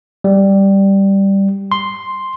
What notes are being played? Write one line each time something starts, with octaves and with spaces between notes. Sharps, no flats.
G3
C6